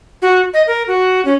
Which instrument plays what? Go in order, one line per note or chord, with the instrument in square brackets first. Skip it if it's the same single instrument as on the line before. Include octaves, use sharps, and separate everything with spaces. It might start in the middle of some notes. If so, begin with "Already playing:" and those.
[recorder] F#4
D#5
A#4
F#4
C#4